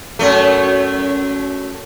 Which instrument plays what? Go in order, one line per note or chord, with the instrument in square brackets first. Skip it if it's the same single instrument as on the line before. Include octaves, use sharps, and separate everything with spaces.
[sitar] F#2 A3